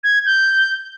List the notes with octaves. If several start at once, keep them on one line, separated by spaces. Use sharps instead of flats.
G#6
G6